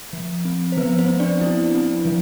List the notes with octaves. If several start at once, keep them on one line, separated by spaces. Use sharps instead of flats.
F3
C4
C5
F3 B3 B4
C4 C5
C4
D4 D5
F3 E4
C4
F3